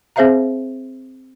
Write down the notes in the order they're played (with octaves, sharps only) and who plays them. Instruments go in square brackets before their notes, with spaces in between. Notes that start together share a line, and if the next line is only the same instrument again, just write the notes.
[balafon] C4 G#4 C5 E5 F5 A#5